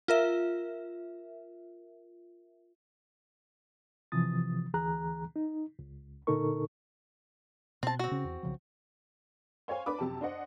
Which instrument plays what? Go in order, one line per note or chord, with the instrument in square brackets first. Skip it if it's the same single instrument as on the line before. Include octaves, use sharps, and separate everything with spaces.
[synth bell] F4 A#4 E5
[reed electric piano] C3 E3 F3 D#6 A6
D2 E3 G#4 A#5 F#6
D#4
C#2
A#2 D3 D#4 A4 A#4 C#6
[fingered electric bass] B2 [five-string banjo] C4 A5
[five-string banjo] C4 F#4
[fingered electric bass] C#3 C#4
E2
B1 C#3 F3
[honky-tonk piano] C5 C#5 F5 G#5
D4 B4 B5 D6
F#2 C3 G4 A5
D4 C5 D#5 F#5